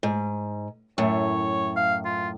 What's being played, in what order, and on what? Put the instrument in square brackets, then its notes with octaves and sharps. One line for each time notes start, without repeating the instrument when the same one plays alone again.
[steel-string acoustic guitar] G#2
[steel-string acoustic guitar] F#2 A2 [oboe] C#5
[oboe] F5
F4